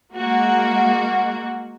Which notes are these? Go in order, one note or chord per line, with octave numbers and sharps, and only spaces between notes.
G#3 A#3 F#4